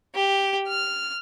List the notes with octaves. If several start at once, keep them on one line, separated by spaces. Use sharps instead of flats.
G4
F6